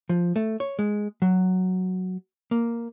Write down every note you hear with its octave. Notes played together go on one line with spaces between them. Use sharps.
F3
A3
C#5
G#3
F#3
A#3